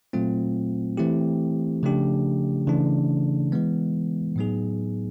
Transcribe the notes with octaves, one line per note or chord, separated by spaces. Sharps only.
A#2 F#3 A3 C4 F4
E3 A3 C4 E4 G4
C#3 F3 A3 D4 G4
C#3 E3 A3 D4
E3 G#3 B3
A2 F#3 B3 D#4 G#4